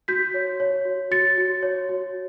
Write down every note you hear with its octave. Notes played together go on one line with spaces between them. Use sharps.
F#4 G6 B6
C#5
C#5
F#4
F#4 A6 C#7
F#4
C#5
F#4